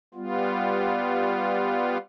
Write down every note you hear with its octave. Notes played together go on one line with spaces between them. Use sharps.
G3 B3 F4